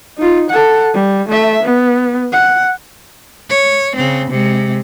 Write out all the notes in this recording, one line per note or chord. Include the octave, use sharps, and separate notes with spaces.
D#4 F4
A4 F#5
G3
A3 E5
B3
F#5
C#5
C#3 C4
C3 G#3